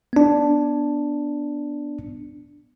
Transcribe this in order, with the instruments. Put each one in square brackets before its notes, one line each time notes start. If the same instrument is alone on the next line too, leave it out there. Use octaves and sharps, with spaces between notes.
[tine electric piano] B3 D4